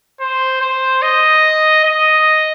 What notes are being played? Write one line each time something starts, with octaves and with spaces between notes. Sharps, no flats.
C5
C5
D#5
D#5